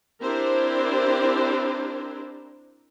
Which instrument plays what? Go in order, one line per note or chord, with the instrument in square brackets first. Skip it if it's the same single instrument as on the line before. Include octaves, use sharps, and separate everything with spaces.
[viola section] C4 D4 E4 G4 A#4 C5